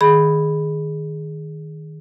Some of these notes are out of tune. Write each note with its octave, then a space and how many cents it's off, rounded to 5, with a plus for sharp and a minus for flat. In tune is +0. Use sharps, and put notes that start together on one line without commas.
D#3 +0 G#4 +0 B5 +0